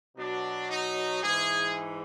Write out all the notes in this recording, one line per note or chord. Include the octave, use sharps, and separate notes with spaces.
B2 F#3 D4
D#4
G#2 E3 G#4